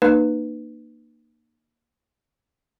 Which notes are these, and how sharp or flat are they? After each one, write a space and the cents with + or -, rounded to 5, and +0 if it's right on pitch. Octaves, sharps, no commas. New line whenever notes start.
A#3 +5 D#4 -35 B4 +0